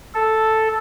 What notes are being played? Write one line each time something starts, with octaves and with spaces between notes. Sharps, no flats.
A4